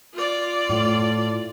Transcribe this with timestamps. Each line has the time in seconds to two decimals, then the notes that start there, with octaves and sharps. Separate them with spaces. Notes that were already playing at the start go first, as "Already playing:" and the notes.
0.13 F4 D5
0.69 A2